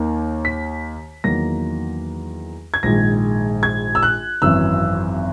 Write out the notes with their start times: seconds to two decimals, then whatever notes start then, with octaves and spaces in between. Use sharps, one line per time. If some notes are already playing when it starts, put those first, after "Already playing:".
Already playing: D#2 D#3 A#3
0.45 B6
1.24 E2 D#3 F#3 A#3 A#6
2.74 G#6
2.83 A#1 G#2 D#3 G#3 A#6
3.63 G#6
3.95 E6
4.03 F#6
4.42 G#1 F#2 E3 E6